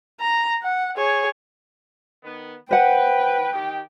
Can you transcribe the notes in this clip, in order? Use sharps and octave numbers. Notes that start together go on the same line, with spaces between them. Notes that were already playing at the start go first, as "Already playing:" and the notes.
A#5
F#5
G#4 C#5
D#3 B3
B4 C5 F#5 G5
D#3 G4